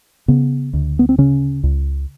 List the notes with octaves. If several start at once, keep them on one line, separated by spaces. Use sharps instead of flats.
C#3 B3
D2
B3
C4
C#3 C#4
C#2